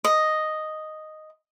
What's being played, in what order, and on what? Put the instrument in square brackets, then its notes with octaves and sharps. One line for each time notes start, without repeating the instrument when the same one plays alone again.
[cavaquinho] D#5